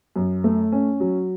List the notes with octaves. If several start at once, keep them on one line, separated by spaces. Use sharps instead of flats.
F#2
A3
C#4
F#3